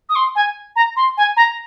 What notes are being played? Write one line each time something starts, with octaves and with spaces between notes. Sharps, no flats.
D#6
C6
G#5
A#5
C6
G#5
A#5